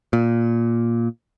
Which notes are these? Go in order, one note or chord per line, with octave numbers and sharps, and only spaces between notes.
A#2